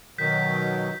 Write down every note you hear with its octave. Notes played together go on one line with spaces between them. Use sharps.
B2 D#3 F#3 G6 B6